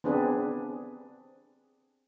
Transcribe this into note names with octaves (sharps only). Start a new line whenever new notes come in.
B3 C4 D4 G#4 B4